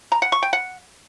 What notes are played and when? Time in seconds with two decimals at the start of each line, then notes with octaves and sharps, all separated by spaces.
0.12 A#5
0.22 F#5
0.32 C#6
0.43 G5
0.53 F#5